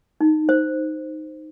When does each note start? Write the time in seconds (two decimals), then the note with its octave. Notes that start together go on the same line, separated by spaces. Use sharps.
0.21 D#4
0.49 C5